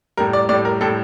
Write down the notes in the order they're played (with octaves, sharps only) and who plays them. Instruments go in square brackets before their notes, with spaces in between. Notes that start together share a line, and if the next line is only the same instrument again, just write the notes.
[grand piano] A2 G3 A#4
D5
A2 G3 D5
A#4
A2 G3 A4